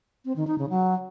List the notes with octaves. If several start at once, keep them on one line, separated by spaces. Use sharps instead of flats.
C4
D#3
D#4
C#3
F#3